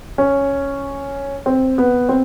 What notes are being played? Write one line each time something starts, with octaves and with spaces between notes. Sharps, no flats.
C#4
C4
B3
C4